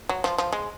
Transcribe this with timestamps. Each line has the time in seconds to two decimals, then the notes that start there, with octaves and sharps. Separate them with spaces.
0.09 F#3
0.24 F3
0.38 F3
0.53 G#3